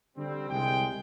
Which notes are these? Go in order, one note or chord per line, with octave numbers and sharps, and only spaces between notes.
D3 G3 C4
C2 G#3 G5